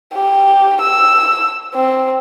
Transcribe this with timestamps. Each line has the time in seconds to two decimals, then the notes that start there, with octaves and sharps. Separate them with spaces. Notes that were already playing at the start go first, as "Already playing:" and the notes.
0.15 G4
0.82 E6
1.75 C4